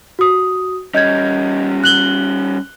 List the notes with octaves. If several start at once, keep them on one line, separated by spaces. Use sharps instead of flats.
F#4 D#6
G3 C#4 D#5 G6 G#6
F#6 F#7 G7